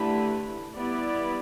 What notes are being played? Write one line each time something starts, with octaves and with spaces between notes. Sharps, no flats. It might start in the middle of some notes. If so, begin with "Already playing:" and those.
Already playing: D3 A3 E4 G4 B4
G3 B3 E4 B4 D5